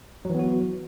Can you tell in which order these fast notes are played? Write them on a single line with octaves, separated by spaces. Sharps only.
F#3 E3 B3 F#4